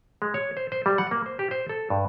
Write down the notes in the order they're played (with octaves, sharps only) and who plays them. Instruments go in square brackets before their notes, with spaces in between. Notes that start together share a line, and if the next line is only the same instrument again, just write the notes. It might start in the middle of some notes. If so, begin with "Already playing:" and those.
[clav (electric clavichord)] G#3
C#5
C5
C5
G3
F#5
A#3
C5
G4
C5
A4
G2